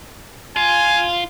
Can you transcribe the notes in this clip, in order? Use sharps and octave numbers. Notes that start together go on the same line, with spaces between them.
F4 G#5